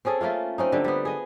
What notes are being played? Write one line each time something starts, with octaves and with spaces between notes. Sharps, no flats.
C4 C#4 G#4 A4
A3 A#3 C#4 F4
C4 C#4 D#4
D3 G3
G3 B3
G#4 D#5